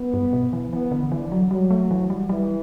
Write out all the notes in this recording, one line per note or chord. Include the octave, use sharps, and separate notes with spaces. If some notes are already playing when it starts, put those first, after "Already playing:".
Already playing: B3
G2
B2
E3
E3 B3
D3
D3 E3
F#3
F#3 G3
A3
E3
G3
E3 G3